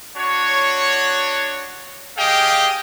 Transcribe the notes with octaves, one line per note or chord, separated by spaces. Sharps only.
D4 F#4 C#5
G4 G#4 D#5 F5 G5